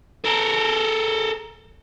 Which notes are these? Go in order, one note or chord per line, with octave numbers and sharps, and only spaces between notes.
A4 A#4